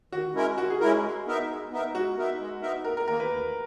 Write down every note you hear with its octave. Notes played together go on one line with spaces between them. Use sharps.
D#3 F#4
G#3 C#4 E4 A#4
D#3 F#4
G#4
G#3 C#4 E4 F#4 A#4
G#3
B3 D#4 A#4 E5
G#3
B3 D#4 A#4 E5
G#3 F#4
B3 D#4 A#4 E5
G#3
B3 D#4 A#4 E5
D#2 A#4
A#4
D#3 A#3 A#4
B4
D#2